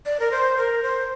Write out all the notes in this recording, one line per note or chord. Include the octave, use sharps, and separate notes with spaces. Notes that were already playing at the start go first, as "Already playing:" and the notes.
D5
A#4
C5
A#4
C5